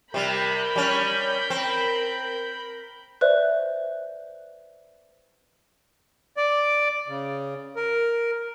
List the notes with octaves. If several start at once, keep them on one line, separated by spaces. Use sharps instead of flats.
C3 G3 A#4 B5 G6
G3 C#4
C4
B4 C5 D5 E5 F#6
D5
C#3
A#4